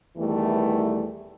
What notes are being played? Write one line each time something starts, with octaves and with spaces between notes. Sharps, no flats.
E2 D#3 E3 G3 A3